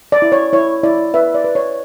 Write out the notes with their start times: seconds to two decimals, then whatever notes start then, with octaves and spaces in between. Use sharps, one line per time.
0.12 D5
0.22 E4
0.32 C#5
0.53 E4 C#5
0.83 E4 D5
1.14 B4 E5
1.35 D5
1.44 B4
1.55 C#5